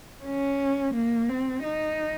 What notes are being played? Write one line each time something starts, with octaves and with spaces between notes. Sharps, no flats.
C#4
A#3
C4
D#4